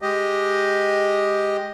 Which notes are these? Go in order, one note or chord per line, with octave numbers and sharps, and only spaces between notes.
G#3 G4 D#5